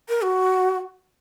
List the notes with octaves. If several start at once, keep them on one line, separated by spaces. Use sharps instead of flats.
A#4
F#4